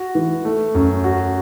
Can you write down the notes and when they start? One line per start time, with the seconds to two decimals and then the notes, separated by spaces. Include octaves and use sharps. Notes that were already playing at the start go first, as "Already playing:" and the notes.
Already playing: F#4
0.15 E3
0.45 A3
0.75 F#2
1.04 F#4